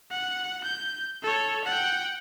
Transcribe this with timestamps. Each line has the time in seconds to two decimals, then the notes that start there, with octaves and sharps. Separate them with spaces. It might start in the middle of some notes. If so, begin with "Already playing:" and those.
0.11 F#5
0.64 G6
1.22 A4 C#5
1.65 F#5 G5